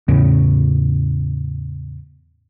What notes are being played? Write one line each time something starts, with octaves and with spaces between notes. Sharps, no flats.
E2 A2 C#3